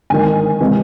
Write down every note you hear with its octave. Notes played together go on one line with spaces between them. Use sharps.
G#1 G#2 D#3 G#5
C3 E3 G#3 C4